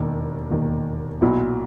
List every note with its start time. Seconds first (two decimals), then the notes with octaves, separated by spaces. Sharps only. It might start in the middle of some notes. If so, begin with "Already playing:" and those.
Already playing: E1 D#2 D#3
0.50 E1 D#2 D#3
1.21 B1 A#2 F#3 B3 E4